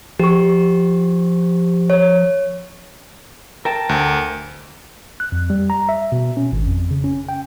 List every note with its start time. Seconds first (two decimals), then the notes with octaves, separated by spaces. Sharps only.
0.19 F3 G4 C#6
1.90 C#5
3.65 A#4 G5 A5
3.89 D2
5.20 F#6
5.32 F2
5.50 G3
5.70 A#5
5.89 E5
6.12 B2
6.37 C#4
6.52 G#1
6.66 F2
6.91 C#3
7.04 C#4
7.29 G5